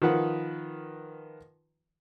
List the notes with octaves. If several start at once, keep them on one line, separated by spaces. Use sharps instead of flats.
D#3 F3 B4 F#5